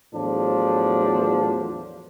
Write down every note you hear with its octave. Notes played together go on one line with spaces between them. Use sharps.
E2 A2 F3 F#3 D4